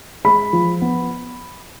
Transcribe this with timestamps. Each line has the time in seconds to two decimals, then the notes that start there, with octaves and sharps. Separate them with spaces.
0.24 G#3 B5
0.53 F3
0.82 B3